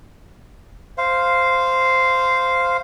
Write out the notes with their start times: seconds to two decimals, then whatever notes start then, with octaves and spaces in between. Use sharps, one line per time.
0.98 C5 F5